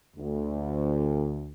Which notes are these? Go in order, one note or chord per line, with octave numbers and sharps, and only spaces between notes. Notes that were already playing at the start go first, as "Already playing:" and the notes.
D2